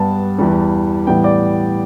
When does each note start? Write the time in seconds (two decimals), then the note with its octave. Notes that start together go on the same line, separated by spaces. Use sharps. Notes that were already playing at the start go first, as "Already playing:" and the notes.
Already playing: G2 G3 B3 A5
0.39 E2 E3 G3
1.07 A2 E3 G3 B3 G5
1.24 D5